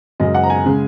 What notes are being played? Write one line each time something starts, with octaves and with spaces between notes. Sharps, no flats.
F#2 C#3 G#3 D#5
F#5
A#5
G#5
C#3 G#3